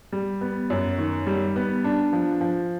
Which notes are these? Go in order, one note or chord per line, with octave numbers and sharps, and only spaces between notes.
G3
B3
F#2
D#3
G3
B3
D4
F3
F3